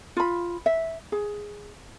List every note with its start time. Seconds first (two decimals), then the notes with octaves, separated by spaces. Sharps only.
0.17 F4 B5
0.66 E5
1.12 G#4